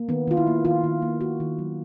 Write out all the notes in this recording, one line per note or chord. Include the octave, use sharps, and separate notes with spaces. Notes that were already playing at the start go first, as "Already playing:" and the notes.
Already playing: A#3
D#3 B3
D#3 F4
E4
A#3
D#3 F4
D#3
A#3
A#3 F#4
D#3
F#3